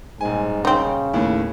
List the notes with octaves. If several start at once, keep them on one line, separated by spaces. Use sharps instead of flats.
D#1 G#2 G#5
C#3 C4 D#4
D#2 A2